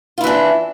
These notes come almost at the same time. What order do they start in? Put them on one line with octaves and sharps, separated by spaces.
F4 E4 E3 D4